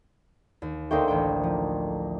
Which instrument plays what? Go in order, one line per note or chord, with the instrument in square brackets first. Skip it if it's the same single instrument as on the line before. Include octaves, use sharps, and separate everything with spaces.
[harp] D#2
[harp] D2 C5 G5 [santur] A3 A#3 D#4
[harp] A1 G5
F3